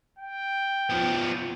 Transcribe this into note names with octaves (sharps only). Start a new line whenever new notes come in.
G5
F3 B3